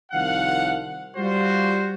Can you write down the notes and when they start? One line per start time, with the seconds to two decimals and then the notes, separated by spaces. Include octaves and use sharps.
0.12 C2 D#3 F3 F5 F#5
1.16 G3 F4 F#4 C5